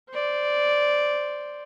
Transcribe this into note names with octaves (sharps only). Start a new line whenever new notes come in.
C5 D5